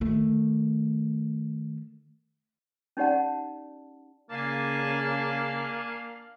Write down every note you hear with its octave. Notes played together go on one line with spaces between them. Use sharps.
D#3 A3
C#4 D#4 G4 D5 F#5 A5
C#3 A#3 D4 F5 G#5 A5